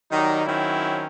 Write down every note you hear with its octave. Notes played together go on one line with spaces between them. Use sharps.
D#3 F#3 G3 D#4
D#3 F#3 C4 C#4 E4